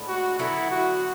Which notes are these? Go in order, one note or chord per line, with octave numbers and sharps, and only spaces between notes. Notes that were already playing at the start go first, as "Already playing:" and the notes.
Already playing: A2 G#3 B3 D4
F#4
D3 F#3 B3 E4
F#4